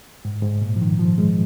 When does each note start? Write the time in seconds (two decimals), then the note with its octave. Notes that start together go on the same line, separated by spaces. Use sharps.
0.25 G#2
0.43 G#2
0.61 A#2
0.76 F3
0.81 D#3
0.99 F3
1.18 G#3